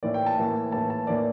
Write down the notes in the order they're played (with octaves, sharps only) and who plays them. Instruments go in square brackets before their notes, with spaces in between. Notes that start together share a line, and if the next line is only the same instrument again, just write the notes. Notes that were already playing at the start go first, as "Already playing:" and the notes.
[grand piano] A2 E3 A#3 D5
G5
A5
A2 E3 A#3
A2 E3 A#3 A5
A5
A2 E3 A#3 D5